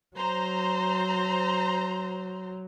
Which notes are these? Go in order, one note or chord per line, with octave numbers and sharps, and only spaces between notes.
F#3 C5 A#5